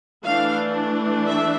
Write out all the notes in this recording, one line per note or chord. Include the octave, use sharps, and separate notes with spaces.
E3 A3 D4 F5
E5